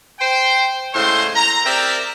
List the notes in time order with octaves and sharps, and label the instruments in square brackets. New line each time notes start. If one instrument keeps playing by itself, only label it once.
[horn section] C5 G5
A2 C#3 G#3 C5 C6
A#5
C4 G4 A#4 D5 E5